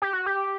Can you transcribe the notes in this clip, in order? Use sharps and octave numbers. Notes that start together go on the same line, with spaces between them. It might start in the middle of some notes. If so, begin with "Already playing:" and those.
G4
F#4
G4